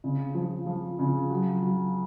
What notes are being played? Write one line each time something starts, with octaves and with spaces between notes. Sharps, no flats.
C#3
F3
F3
C#3
F#3
F#3